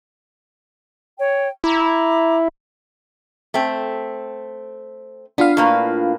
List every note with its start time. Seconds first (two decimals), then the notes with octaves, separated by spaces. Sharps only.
1.18 C#5 G5
1.64 E4 A#5 D6
3.54 A3 C4
5.38 B3 D4 F4 F5
5.57 A2 A#3 B4